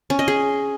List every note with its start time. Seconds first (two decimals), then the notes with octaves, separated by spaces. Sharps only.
0.10 C#4
0.19 D#5
0.28 G#4